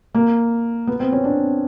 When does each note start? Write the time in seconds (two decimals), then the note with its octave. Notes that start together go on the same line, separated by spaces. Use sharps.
0.15 A#3
0.87 B3
1.00 C4
1.12 C#4
1.24 D4